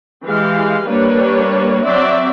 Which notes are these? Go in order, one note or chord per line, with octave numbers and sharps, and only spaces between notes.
E3 G#3 G4 F5
G3 A#3 D4 B4 C#5
F#3 C4 D5 E5